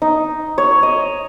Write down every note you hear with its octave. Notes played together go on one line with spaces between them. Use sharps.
D#4
C#5
D#5